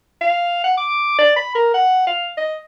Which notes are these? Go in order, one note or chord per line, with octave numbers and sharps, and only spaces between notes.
F5
F#5
D6
D5
B5
A#4
F#5
F5
D#5